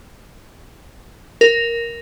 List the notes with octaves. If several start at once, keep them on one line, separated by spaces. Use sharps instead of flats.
A#4